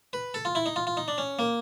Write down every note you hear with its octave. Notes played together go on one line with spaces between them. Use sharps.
B4
A4
F4
E4
D#4
F4
F4
D#4
D4
C#4
A#3